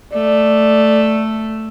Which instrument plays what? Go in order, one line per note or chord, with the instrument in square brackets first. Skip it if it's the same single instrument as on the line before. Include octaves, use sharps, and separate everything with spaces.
[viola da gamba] A3 [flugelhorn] D5